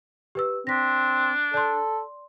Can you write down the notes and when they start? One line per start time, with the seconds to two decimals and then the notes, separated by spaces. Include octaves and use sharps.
0.35 G4 B4 E6
0.67 C4 D4 A#6 B6
1.54 A4 D5 C6